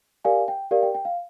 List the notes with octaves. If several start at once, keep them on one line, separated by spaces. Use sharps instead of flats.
G4 A#4 D5 F5 G#5
G5
G4 A#4 D5 F5
G5
G5
F5